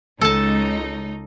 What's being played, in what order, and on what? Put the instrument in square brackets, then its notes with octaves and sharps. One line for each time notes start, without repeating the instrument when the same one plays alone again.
[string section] C#2 D#4 [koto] A4 A5